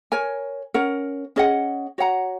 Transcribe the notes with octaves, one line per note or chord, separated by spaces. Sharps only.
A#4 C#5 G#5
C#4 A#4 F#5
C#4 G#4 D#5 F#5
F#4 C#5 F#5 A#5